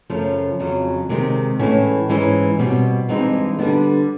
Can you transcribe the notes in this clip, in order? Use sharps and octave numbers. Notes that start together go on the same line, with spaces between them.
F#2 C#3 F3 A3
F2 C#3 F#3
C3 D#3 G#3 C4
A2 E3 G#3 C#4 E4
G#2 E3 G#3 C#4 E4
B2 G3 C4
G2 E3 G#3 C4 D#4
D3 G3 B3 D4